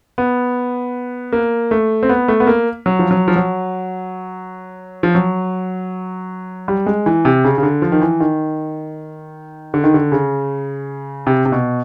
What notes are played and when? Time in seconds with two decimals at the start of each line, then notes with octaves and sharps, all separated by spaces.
0.18 B3
1.32 A#3
1.71 A3
2.03 C4
2.09 B3
2.28 A3
2.40 B3
2.47 A#3
2.86 F#3
2.99 F3
3.11 F#3
3.28 F3
3.36 F#3
5.03 F3
5.15 F#3
6.68 G3
6.86 G#3
7.06 E3
7.25 C3
7.45 C#3
7.58 C#3
7.63 D3
7.82 F3
7.92 D#3
8.02 E3
8.20 D#3
9.74 D3
9.84 D#3
9.94 D3
10.12 C#3
11.27 C3
11.46 C3
11.52 B2